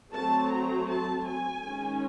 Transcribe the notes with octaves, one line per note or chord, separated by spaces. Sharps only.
F#3 A3 C4 A5
A#5
A5
G#5
D#3 G#3 C#4